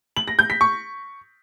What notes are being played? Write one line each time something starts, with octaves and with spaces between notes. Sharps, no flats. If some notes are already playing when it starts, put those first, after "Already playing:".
F#7
A#6
G6
B6
C#6